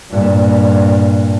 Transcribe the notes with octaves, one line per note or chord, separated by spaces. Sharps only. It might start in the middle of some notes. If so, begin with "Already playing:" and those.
G2 A#2